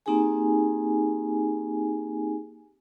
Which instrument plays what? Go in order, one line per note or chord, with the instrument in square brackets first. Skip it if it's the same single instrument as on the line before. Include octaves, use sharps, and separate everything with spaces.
[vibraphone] A#3 C4 D#4 G4 G#4 G#5